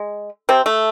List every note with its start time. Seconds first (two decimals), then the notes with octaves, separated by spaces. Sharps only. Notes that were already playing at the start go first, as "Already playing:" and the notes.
Already playing: G#3
0.49 C3 C4
0.66 A3